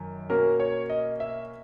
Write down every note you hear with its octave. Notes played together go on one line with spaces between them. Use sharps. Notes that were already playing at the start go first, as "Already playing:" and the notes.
Already playing: F#2 D#3
B2 A#3 C#4 A#4
C#5
D#5
E5